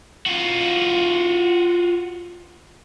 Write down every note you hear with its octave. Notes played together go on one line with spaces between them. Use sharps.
F4 F#4